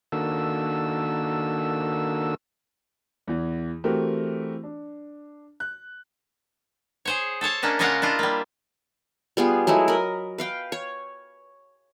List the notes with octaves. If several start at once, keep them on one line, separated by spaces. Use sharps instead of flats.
D#3 A#3 D4 F#4 A4 E6
E2 E3
E3 A3 C4 F#4 G4 A#4
D4
F#6
G#4 C5 C#5
A4 C5 C#5 A5
A#3 C#4 D4 D#5
C#3 G#3 F4 A#4 F5 F#5
D4 E4 F4 D#5
G3 A#3
G3 B3 F4 G#4
F#3 G#3 A3 E4
A#4 D#5 B5
B4 F5 G5
C#5